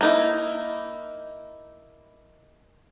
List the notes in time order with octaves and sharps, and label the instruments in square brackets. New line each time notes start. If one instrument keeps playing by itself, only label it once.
[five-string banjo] A#3 D#4 E4